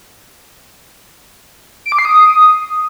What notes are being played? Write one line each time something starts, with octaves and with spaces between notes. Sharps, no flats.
D7
D6
C7
D#6